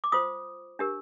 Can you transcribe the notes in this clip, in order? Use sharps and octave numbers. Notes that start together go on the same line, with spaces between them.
D6
F4 C5 D#6
D4 G4 A#4